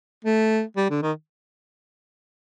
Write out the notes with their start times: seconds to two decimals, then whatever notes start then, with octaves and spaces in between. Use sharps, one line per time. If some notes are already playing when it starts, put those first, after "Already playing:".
0.25 A3
0.77 G3
0.90 D3
1.02 D#3